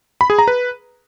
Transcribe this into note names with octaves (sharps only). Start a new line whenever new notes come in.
B5
G#4
A#5
B4